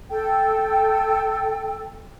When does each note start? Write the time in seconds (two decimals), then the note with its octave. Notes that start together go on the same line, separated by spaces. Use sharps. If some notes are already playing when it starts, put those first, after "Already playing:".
0.10 A4 G5